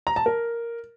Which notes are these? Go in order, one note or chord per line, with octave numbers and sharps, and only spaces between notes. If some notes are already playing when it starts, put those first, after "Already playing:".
A#5
A5
A#4